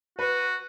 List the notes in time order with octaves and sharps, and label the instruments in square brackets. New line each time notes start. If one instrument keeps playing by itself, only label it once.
[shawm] F#4 [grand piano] B4